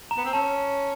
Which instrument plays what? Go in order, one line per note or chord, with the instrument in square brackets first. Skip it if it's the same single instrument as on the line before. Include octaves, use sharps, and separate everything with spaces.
[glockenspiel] A#5
[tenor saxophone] B3
C4
[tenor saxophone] C#4 [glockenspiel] A5